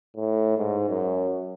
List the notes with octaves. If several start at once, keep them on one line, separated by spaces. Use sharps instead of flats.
A2
G#2
F#2